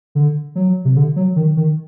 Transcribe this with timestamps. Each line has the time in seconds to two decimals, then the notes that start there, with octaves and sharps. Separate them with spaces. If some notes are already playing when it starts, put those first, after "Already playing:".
0.15 D3
0.55 F#3
0.85 C3
0.96 D3
1.16 F#3
1.36 D#3
1.57 D#3